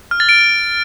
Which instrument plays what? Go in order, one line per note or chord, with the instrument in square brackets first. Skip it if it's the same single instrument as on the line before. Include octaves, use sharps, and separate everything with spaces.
[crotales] F6
A6
D7